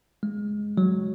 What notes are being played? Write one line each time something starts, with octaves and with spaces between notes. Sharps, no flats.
G#3
F#3